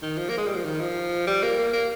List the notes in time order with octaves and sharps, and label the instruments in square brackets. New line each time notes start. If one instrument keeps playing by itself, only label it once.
[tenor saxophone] D#3
F3
A#3
G#3
G3
F3
D#3
F3
G3
A#3
A#3
A#3